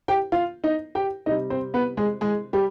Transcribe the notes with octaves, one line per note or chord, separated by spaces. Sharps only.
G4 G5
F4 F5
D#4 D#5
G4 G5
C3 G3 D#4 D#5
C4 C5
B3 B4
G#3 G#4
G#3 G#4
G3 G4